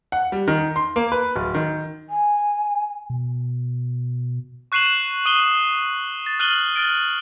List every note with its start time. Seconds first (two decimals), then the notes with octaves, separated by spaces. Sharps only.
0.12 F#5
0.32 G3
0.48 D#3
0.76 C6
0.96 A#3
1.12 B4
1.36 D1
1.54 D#3
2.10 G#5
3.10 B2
4.72 C#6 F#6 C7 D#7 E7 F#7
5.26 D#6 D#7 G7
6.26 A6
6.39 F6 F#6 D#7 F#7 G7
6.76 F6 A6 D7